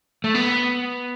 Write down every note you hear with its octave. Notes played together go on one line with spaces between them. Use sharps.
A3
B3